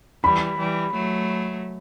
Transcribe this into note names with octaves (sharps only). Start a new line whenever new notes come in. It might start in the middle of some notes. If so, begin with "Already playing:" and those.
E3 G3 B5
E3 G3
F#3 A3